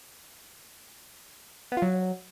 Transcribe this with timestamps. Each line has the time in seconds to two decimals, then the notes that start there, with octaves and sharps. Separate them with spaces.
1.72 B3
1.77 F4
1.82 F#3